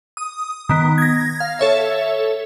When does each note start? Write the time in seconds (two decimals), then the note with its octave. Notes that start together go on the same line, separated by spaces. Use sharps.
0.17 D#6
0.69 D#3 B3
0.98 G#6 A#6
1.40 F5
1.59 A4 C#5 E5